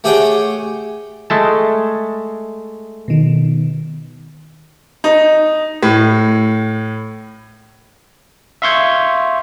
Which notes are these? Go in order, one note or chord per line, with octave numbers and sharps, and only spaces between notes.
A3 G4 G#4 C#5 F#5 G5
G#3 A3 A5
B2 D#3
D#4
A2
E5 F5 C6 C#6 G6 G#6